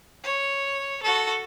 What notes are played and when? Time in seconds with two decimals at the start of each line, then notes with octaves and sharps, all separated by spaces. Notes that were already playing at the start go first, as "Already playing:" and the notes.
0.24 C#5
1.02 F#4 A4